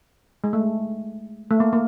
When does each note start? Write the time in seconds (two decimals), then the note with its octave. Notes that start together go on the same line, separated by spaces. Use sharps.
0.44 G#3
0.53 A3
1.51 A3
1.60 A#3
1.73 A#3